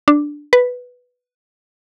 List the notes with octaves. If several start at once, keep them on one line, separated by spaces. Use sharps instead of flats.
D4
B4